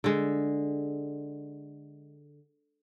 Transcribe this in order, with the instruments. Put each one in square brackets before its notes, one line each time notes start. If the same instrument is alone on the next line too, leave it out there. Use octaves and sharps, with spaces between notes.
[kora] D3 G#3